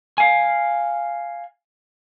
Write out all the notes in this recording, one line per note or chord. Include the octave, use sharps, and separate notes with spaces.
F5 G#5